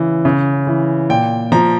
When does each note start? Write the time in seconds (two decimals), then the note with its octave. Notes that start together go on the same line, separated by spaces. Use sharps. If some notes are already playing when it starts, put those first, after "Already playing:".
Already playing: C#3 E3
0.25 C#3
0.67 E3
1.09 A#2 G5
1.52 F3 A#5